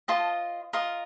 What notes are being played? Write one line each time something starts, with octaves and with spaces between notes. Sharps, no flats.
F4 C5 D#5 A5
F4 A#4 D#5